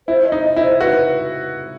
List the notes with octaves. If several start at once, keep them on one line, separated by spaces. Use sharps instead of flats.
E4 C5
D#5
D#4
D#5
E4
C5
F#4 B4